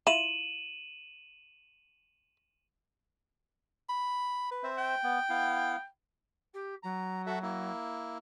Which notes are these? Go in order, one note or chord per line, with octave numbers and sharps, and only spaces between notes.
E4 F4 D#7 E7 F#7
B5
B4
C4 C5 E5
G5
B3
B3 E4 F5
G4
F#3 A#5
F#4 A4 E5
A#3 E4